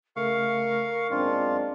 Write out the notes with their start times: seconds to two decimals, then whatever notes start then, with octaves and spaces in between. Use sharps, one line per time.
0.16 C#3 A3 A#4 F5 C#6
1.11 F#2 G#3 A#3 C4 D4 F4